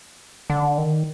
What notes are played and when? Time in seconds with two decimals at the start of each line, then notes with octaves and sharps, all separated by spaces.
0.50 D3
0.78 D#3